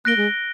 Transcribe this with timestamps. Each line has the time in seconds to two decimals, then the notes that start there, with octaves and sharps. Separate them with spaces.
0.05 A#3 F#6 A#6 D7 G7
0.17 G#3